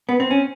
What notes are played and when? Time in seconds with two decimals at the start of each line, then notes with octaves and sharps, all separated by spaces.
0.09 B3
0.20 C4
0.31 C#4